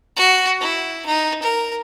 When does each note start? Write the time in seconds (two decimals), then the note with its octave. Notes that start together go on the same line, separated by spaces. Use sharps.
0.16 F#4
0.60 E4
1.06 D#4
1.42 A#4